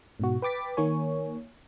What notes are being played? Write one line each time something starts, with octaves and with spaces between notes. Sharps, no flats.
G#2 B2 F#4
B4 G5 D6 A6 B6
D#3 A#3 C#5 G#5